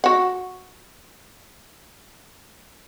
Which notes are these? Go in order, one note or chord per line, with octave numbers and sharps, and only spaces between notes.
F#4 F#5